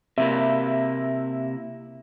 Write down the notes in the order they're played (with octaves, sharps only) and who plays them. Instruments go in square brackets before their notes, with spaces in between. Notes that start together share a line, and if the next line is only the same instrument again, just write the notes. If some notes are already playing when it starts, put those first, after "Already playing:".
[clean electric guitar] C3 A#3 E4 [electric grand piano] E5